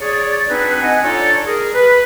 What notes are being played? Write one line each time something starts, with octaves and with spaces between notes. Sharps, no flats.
G#4 C#5 D5
C4 D4 D#4 F#4 G#4 B4
D#5 F#5 G#5
D4 D#4 F4 A4 C#5 D5
G#4 A#4
B4